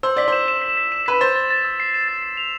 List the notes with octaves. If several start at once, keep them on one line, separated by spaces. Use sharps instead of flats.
C5 E6
D5 B6
C5 E7
E7
B6
B6
E7
B4 B6
C5 A6
A6
A6
E6
C7
E7
A6
C7
F7